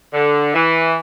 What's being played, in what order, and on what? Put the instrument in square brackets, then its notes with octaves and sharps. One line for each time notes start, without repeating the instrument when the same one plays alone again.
[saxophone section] D3
E3